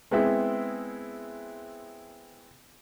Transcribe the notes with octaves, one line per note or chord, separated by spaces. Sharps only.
G#3 B3 C4 E4 G#4